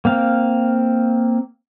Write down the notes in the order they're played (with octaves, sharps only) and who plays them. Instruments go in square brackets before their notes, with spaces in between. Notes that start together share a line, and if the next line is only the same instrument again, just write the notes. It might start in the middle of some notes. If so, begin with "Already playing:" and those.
[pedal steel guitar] A#3 C4 F5